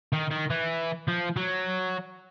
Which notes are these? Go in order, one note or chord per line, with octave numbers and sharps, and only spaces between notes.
D#3
D#3
E3
F3
F#3